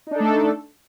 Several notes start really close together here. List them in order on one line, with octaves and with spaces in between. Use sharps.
D#4 D4 A4 A3